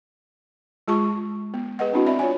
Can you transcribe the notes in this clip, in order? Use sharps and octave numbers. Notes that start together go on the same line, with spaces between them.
G#3 F4 G#4 A5 C#6
B3
G#4 B4 D#5 F#5
C4 D4 E4 F#4
C4 D5 E5 B5
F4 C#5 G#5